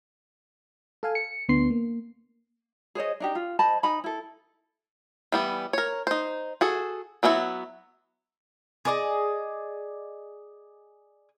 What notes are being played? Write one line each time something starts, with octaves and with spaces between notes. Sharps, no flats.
A4 F5 G#5
C#7
D2 B3 D4 C6 C7
A#3
G#4 C5 C#5 D#5
D4 D#4 G4
F4
C5 D#5 A5 B5
D#4 G#5 B5
E4 A4
E3 G3 B3
A#4 C#5
D#4 C5
F#4 G#4 A4
F#3 B3 D4 E4 F#4
G#4 A#4 D5 D#5